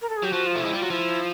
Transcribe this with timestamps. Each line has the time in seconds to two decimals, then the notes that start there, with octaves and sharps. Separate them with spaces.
0.02 A#4
0.09 A4
0.17 G#4
0.23 F#3 G4
0.32 F3 F#4
0.47 F4
0.55 A3
0.61 G#3 E4
0.73 G3 F4
0.81 F#3
0.90 F3 E4